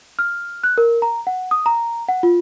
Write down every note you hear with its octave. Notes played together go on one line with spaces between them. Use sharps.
F6
F#6
A#4
A#5
F#5
D#6
A#5
F#5
F4